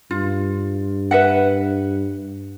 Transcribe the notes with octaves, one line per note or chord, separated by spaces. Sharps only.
G2 F4
B4 E5 F#5